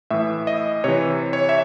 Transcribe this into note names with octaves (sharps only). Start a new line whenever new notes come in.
A2 E3 E5
D#5
C3 E3 C#5
C#5
E5